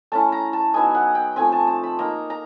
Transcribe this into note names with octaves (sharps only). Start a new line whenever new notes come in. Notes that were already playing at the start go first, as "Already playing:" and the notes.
A3 C#4 E4 A5
A#5
A5
F#3 B3 D#4 G#5
F#5
G5
F3 A3 C4 G#5
A5
A5
B5
A#3 D#4 A#5
A#5